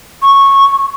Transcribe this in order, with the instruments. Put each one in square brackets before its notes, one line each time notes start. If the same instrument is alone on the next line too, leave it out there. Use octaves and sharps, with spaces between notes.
[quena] C#6